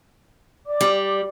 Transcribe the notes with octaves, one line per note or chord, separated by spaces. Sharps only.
D5 D6
G3